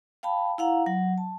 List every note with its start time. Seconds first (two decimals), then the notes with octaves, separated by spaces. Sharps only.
0.23 F5 G5 A5 B5
0.58 E4 F5 F#5 A#5
0.86 F#3 F#5
1.18 A5